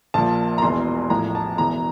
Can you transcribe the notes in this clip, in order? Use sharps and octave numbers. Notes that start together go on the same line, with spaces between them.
A#1 A#2 F3 A5
A#5
E1 E2 E3 C6
A1 A2 F3 A#5
A5
E1 E2 E3 A#5